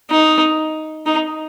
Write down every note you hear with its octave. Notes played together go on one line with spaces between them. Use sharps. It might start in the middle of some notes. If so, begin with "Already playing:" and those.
D#4
D#4